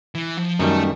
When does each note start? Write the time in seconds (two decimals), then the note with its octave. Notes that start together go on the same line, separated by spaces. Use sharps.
0.15 E3
0.37 F3
0.59 F#2 D#3 G3 A3